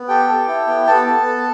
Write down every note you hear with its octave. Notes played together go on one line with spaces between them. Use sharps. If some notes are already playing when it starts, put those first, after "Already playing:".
Already playing: B3
G4 A4 G5
A4
E4
B3
B3 A4 A5
B3
A4